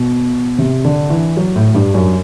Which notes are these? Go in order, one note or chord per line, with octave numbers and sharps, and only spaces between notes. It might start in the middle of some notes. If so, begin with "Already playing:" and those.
Already playing: B2
C3
D3
E3
F#3
A2
G2
F#2